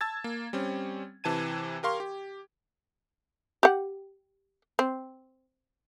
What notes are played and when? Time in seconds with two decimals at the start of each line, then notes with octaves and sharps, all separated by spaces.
0.01 A5 E6 G#6 A6
0.24 A#3
0.53 G3 C4 C#4
1.24 C3 E3 A5 G#6 D#7
1.83 G4 A#4 F5 C6 C#6
2.00 G4
3.63 G4 F#5
4.79 C4